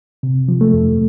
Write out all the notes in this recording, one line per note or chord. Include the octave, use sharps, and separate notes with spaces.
C3
F3
A3
F2